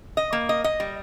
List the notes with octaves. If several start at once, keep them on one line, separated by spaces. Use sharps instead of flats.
D#5
A#3
D#5
D#5
G3